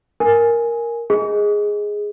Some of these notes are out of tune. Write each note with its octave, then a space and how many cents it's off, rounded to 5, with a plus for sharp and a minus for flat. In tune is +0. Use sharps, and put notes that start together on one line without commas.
A#4 +0 G#5 +0
G#4 +0 D#5 +10